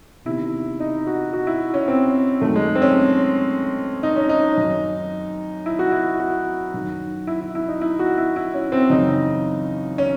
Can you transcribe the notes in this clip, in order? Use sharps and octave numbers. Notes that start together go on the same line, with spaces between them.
E2 C3 D#3 E4
D#4
F#4
F#4
E4
C#4
C4
F#2 D#3 A3
G#3
C4
C#4
D#4
C#4
D#4
F#2 D#3
E4
F#4
E4
F#4
F#2 D#3
E4
E4
E4
D#4
E4
F#4
E4
E4
C#4
C4
F#2 C#3 E3 D#4
C#4